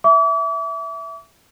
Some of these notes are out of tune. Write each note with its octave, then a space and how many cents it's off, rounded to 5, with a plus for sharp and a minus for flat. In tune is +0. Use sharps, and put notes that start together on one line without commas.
E5 +0 D6 -40